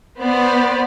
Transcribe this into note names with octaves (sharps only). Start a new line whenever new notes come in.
B3 C5 D5